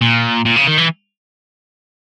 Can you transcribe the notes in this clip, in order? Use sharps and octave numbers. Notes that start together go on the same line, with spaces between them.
A#2
A#2
C#3
D#3
E3